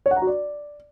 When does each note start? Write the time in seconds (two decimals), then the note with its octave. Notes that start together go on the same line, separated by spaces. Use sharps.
0.06 C#5
0.11 F#5
0.16 A#5
0.22 F#4
0.27 D5